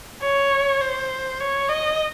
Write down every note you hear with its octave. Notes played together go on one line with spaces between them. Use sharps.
C#5
C5
C#5
D#5